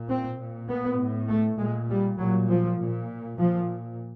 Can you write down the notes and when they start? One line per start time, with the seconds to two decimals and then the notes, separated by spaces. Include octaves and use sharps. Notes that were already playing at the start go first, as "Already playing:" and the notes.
Already playing: A#2
0.09 C4
0.39 A#2
0.69 B3
0.99 A2
1.29 A3
1.59 A#2 G#3
1.89 G3
2.19 A#2 F#3
2.49 F3
2.79 A#2
3.39 A#2 F3